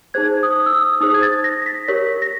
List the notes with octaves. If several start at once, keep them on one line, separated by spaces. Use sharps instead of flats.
D#4 G#4 C5 G#6
D#6
E6
D#6
D#4 G#4 C5 D#6
G#6
A6
A#6
A#6
B6
G4 A#4 C#5 B6
A#6